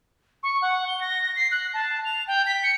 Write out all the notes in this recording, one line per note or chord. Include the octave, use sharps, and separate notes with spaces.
C#6
F#5
G7
A#6
C7
F#6
A5
F7
G5
B6
C#7